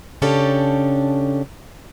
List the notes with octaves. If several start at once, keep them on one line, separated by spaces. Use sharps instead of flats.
C#3 C#4 D4 G4 A4